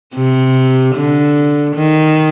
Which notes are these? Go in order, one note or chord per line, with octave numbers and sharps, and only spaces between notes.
C3
D3
D#3